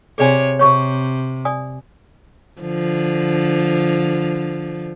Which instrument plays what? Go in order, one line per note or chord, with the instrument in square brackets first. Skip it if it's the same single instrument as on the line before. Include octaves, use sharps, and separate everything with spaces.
[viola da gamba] C3 C#5 [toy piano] G#4 D5 G#5
[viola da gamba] C3 [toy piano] C#5 C#6
[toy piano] D5 G#5 D#6
[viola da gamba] D3 F3